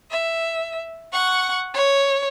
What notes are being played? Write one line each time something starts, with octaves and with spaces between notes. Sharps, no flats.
E5
F#5 C#6
C#5